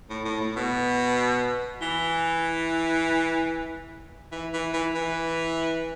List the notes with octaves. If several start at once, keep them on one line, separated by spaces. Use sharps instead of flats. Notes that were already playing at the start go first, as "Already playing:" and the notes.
A2
A2
A2
B2
E3
E3
E3
E3
E3